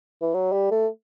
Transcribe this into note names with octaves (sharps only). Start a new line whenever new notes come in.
E3
F#3
G3
A3